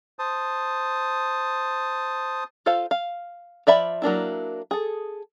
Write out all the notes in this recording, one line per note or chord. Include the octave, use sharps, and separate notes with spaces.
C5 A5 D#6
F4 A4 C5 F5
F5
F3 D5 E5 B5
F#3 A#3 D4 E4
G#4 A4